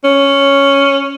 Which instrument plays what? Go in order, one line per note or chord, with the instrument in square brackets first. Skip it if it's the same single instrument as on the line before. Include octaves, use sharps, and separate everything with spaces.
[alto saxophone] C#4